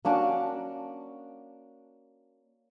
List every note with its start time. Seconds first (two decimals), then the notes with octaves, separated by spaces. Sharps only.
0.05 A#3 C#4 D4 F#4